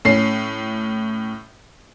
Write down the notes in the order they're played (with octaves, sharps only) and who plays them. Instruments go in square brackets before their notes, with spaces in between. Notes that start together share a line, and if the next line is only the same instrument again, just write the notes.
[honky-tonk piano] A2 C#4 C7